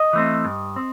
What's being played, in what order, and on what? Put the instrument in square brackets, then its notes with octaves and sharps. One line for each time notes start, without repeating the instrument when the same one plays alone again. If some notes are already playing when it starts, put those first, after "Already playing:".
Already playing: [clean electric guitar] D#5
E3 A3 C4
G2
C4